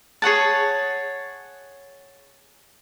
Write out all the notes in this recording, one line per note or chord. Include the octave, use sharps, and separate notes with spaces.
G#4 C#5 F#5 A5